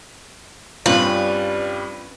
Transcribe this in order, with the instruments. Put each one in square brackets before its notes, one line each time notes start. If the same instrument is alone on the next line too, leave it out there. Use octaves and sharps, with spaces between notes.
[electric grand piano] G2 G3 C#4 [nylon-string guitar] C4 F4 [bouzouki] B4 [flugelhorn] D5